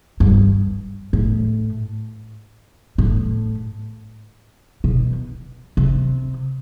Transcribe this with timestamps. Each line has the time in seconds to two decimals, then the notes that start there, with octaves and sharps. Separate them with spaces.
0.20 G2
1.13 A2
2.98 A2
4.84 B2
5.77 C3